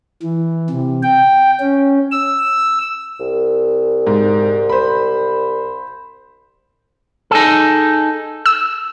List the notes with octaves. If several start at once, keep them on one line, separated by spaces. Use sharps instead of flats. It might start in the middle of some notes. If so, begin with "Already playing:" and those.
E3
C3
G5
C#4
E6
C2
G#2
C5 B5
D#4 G#4 A4
E6